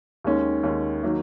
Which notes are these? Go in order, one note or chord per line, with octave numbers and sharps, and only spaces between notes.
D#2 D#3 G#3 C#4
D#2 D#3 G#3 C#4
D#3 F#3 A#3